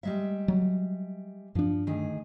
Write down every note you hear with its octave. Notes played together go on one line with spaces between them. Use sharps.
G3 G#3 E5
F#3
G2 F3 D4
D2 D#3 G#4